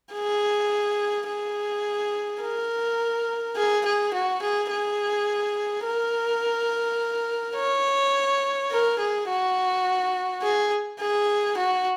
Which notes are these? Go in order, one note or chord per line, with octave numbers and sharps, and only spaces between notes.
G#4
G#4
A#4
G#4
G#4
F#4
G#4
G#4
A#4
C#5
A#4
G#4
F#4
G#4
G#4
F#4